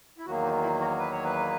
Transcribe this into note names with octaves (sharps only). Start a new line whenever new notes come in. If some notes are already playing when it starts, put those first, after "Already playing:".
E4
E2 D#3 F#3 A#3 F#4
D#4
E4
F#4
B4
C#5
B4